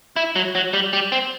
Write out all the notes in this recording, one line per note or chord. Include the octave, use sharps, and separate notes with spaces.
E4
F#3
F#3
G3
G3
C4